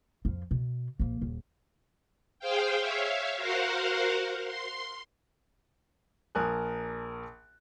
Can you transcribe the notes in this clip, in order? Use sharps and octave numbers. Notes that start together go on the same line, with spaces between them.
F2 F3
B2
A#1 A#3
D#1
G#4 C5 F5 G5
C#5 E5 F5
F#4 A#4 C5 F5 F#5
C6
A#1 A#4 G#5 A5 D#6 F#6